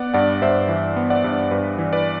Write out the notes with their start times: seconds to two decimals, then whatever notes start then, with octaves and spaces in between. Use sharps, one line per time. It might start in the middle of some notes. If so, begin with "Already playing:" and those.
Already playing: B3 D5 F#5
0.14 G2 D5 F#5
0.42 G2 C5 E5
0.68 E3
0.96 B3
1.10 D5 F#5
1.24 G2
1.51 G2 B4 D5
1.78 E3
1.93 B4 D5